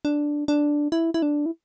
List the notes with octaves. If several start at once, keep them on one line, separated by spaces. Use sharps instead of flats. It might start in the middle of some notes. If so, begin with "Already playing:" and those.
D4
D4
E4
E4
D4
E4